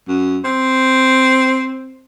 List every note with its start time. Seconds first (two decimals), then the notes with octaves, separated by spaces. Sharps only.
0.08 F#2
0.45 C4